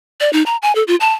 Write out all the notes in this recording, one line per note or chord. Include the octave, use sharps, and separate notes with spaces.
D5
D#4
A#5
G#5
A4
F4
A5